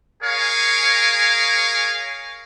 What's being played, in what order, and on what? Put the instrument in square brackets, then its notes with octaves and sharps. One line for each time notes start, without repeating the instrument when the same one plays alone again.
[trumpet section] G#4 A#4 C#5 F5 G#5